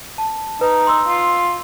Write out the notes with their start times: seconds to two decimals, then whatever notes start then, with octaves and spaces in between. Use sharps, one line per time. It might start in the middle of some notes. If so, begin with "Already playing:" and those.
0.18 A5
0.61 D#4 B4
0.87 C6 E6
1.08 F4